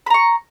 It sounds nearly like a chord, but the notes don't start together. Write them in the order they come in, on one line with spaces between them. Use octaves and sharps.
B5 A#5 C#6